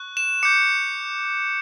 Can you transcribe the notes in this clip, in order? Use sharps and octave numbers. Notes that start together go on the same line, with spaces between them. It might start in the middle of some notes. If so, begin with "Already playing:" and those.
Already playing: C#6 F#6
E7
D6 G6 C#7